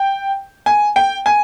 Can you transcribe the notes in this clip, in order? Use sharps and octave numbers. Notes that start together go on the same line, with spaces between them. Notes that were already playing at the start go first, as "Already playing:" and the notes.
Already playing: G5
G#5
G5
G#5